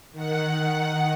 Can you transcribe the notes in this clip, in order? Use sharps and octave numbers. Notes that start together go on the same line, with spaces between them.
D#3 F#5